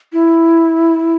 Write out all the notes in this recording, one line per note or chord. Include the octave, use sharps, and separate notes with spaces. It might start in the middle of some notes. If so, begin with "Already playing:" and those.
E4